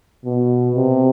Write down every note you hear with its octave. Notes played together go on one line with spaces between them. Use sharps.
B2
C3